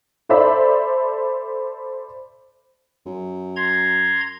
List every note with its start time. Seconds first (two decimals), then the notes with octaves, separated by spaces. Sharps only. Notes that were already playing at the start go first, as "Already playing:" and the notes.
0.29 A4 C5 D5 E5 B5
3.06 F#2
3.56 A#5 C6 G#6